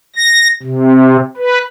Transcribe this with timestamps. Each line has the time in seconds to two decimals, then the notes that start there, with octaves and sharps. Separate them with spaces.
0.16 A#6
0.63 C3
1.37 B4